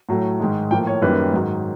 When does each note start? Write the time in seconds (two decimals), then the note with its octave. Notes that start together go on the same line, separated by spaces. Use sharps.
0.09 A2 F#3 A3
0.40 G#2 D#3 G#3
0.71 A2 F3 A#3 G5
0.87 C#5
1.02 F#2 D#3 G3 A#3 B4
1.33 G#2 D#3 F#3